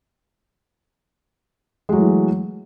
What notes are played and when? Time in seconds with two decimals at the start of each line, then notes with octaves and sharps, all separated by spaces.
1.89 G#3
1.93 F#3
1.96 A3
2.00 E3